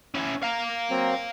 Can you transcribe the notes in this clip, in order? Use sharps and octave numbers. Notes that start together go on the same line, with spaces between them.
C#4 E4
F5 A#5
F#3 A#3 C4